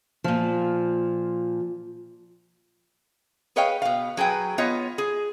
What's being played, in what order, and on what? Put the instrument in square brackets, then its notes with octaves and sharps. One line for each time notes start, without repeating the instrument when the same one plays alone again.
[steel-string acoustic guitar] A#2 F3
[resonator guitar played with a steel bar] G#4 B4 C#5 D#5 F5 G5
B2 F5
F#3 G#4 B4 G5
B3 F4 C#5 D#5
G#4